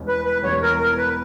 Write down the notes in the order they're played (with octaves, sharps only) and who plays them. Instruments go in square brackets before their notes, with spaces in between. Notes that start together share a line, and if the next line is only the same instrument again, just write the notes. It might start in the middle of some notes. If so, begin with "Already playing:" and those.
Already playing: [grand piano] E1 E2 B2 G3 C#4
[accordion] B4
B4
[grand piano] E1 E2 B2 G3 C#4 [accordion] C#5
[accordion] A#4
A#4
B4